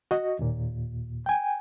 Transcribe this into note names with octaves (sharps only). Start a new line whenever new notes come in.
F#4 D#5
D#2 A#2
G5 G#5